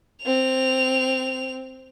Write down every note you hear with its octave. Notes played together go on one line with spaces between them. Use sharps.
C4 F7